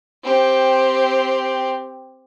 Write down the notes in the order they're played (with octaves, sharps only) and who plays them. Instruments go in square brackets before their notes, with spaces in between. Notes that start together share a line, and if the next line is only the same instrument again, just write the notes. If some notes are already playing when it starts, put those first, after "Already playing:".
[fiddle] C4 G4